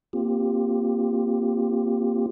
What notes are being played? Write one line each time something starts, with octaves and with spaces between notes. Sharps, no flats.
A#3 C4 F4 G4